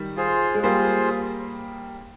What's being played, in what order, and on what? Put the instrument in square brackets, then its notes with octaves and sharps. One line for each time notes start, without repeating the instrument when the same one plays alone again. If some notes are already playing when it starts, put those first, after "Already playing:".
Already playing: [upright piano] D#3 G3
[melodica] F4 G#4 C5
[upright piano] G#3
[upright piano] G3 A#3 [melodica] F4 G#4 C5